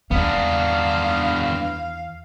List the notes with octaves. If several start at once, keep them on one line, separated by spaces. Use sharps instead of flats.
E2 B3 D4 F5